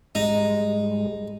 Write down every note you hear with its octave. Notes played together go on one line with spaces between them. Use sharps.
G#2 G3 G#3 D#4